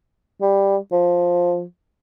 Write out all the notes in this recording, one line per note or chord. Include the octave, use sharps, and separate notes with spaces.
G3
F3